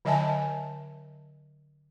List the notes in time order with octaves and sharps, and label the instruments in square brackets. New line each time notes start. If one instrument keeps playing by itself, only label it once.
[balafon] D3 F#3 D#5 E5 G#5 A5